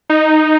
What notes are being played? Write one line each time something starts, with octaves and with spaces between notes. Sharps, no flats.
D#4